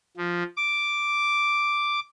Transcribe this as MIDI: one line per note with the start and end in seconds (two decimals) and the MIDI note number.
0.17 0.43 53
0.57 2.00 86